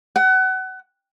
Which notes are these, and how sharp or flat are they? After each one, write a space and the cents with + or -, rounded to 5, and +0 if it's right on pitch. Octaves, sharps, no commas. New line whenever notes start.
F#5 +25